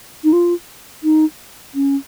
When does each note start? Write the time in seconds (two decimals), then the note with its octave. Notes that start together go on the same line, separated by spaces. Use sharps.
0.24 D#4
0.33 F4
1.04 D#4
1.75 C#4